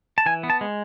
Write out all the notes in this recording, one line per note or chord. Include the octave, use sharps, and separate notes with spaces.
A5
E3 G#5
B3
A5
G#3